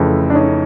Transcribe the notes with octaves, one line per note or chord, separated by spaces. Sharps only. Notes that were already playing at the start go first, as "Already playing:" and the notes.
Already playing: F2 C#3 E3 A3
D4
C#4 D#4